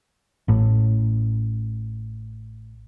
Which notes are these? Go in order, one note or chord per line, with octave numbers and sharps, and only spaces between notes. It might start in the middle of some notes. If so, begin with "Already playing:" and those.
A1 A2